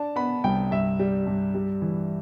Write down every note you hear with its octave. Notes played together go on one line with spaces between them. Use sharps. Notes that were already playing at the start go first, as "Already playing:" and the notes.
Already playing: D4 A5
B3 B5
C2 G5
G2 E5
G3
G2
G3
E3